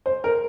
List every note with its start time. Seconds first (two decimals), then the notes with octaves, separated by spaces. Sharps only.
0.06 C5
0.24 A#4